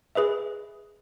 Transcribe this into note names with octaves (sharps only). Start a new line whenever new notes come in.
G#4 B4 D#5 E5